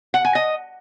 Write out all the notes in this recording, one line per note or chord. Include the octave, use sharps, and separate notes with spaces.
F#5
G#5
D#5